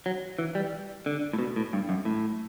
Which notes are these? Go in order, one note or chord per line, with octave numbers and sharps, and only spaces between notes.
F#3
E3
G3
D3
A2
B2
A2
G2
F#2
A2